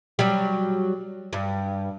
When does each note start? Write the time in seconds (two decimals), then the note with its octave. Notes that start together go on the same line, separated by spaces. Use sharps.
0.19 F#3 G3
1.33 G2